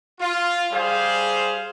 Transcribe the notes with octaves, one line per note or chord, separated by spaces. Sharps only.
F4
G3 G#4 C5 F5